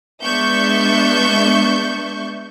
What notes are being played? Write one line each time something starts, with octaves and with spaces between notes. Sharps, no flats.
G#3 B3 D4 E5 C#6 G6